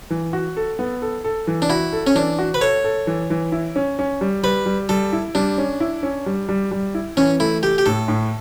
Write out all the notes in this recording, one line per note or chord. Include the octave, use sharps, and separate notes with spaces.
E3
F#4
A4
B3
A4
A4
E3
D4
E4 F#4
A4
C#4
E3 D4
F#4
B4
A4 C#5
A4
E3
E3
E4
C#4
C#4
G3
G3 B4
G3
G3 A4
E4
G3 D4
C#4
E4
C#4
G3
G3
G3
E4
E3 C#4
A3 E4
A3 G4
G4
A2 A4
A2